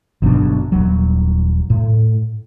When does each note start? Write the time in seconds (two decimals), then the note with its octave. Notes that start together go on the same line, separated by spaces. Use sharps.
0.22 G1 B2 F#3 D4
0.72 D#1 F#3
1.70 A2